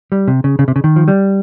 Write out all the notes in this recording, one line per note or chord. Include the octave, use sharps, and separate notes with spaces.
G3
C3
C#3
C#3
C3
C#3
D#3
F3
G3